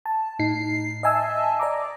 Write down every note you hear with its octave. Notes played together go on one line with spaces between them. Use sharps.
A5
A2 D#4 C7
D#5 E5 G#5 A5 E6
D5 D#5 A#5 D6